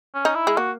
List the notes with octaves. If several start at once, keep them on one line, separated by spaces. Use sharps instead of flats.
C#4
D#4
E4
G#3
A#3 F#4